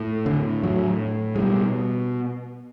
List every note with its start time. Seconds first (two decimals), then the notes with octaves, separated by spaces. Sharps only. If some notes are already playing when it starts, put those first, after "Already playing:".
Already playing: A2
0.26 D3
0.63 A2 F#3
1.36 G#3
1.40 B2 G3